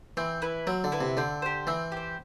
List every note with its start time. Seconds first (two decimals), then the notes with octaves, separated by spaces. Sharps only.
0.17 E3 C4
0.42 E4 B4
0.67 F#3 C4
0.84 D3
0.92 E4 B4
1.01 C3
1.17 D3 C4
1.42 G4 C5
1.67 E3 C4
1.92 G4 C5